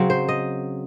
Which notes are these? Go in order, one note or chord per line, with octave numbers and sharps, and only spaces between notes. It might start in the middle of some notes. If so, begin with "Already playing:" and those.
Already playing: C#3 F#3 C4
C5
D#5